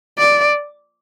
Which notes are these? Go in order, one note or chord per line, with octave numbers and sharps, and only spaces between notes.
D5